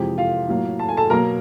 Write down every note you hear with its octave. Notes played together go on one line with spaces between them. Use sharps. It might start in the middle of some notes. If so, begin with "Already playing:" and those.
Already playing: F2 C3 E3 G#3 G4
F4 F5
A2 F#3 A#3
A5
G#5
A4 A5
B2 F#3 A#3 A#4 A#5